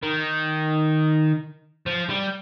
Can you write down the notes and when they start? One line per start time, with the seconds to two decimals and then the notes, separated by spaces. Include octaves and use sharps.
0.03 D#3
1.87 F3
2.10 G3